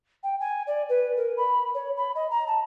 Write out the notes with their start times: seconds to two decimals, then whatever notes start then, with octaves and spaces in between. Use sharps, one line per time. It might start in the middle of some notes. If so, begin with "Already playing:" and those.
0.23 G5
0.40 G#5
0.67 D5
0.89 B4
1.17 A#4
1.37 B5
1.75 C#5
1.96 B5
2.15 D#5
2.31 A#5
2.47 A5